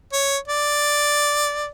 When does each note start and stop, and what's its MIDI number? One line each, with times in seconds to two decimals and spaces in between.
0.13 0.37 73
0.48 1.70 74